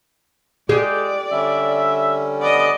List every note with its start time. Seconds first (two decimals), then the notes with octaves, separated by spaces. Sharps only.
0.69 G#3 G4 G#4 D5
1.32 D3 G3 C#4 E5
2.41 B3 D5 D#5